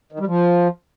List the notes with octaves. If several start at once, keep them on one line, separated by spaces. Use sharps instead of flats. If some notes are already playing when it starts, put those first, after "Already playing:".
D#3
G3
F3